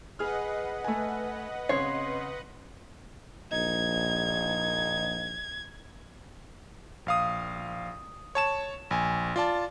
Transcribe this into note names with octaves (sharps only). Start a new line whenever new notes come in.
G#4 B4 D#5 F#5 F6
A3 G#5
C#3 C4 C#5 C6 C7
A#1 D#4 G#6
A#1 F5 D#6
C#5 A5 E7
A#1 G#5
F4 D5 A5